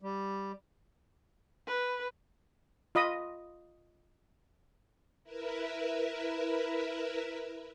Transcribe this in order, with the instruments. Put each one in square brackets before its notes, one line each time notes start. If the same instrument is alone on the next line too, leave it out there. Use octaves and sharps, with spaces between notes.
[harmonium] G3
[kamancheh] B4
[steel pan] F4 D#5 B5 D#6
[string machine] E4 A#4 B4 E5